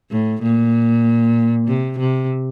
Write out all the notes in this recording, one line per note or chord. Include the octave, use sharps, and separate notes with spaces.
A2
A#2
C3
C3